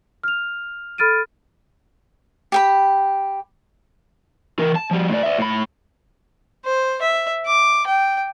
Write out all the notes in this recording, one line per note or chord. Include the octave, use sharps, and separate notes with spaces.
F6 F7
A4 B5 F6 A6 D7 D#7
G4 G5 B5
E3 A#4
A5
F3 G3
A2 D5
D5 E5
A2 B5
C5
E5
D6
G5